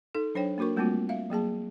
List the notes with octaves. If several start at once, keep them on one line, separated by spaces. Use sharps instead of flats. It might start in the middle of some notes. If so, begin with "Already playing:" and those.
D#4 A4
F#3 D4 C5 C#5 G5
A#3 D4 F#4 A#4 C#6
G3 A3 A#3 C4 F4 F#4
E5 F5
F#3 A#3 G#4 A5